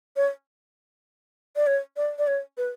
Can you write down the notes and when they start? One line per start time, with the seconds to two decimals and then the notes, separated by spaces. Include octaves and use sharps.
0.16 C#5
1.56 D5
1.67 C#5
1.97 D5
2.19 D5
2.27 C#5
2.58 B4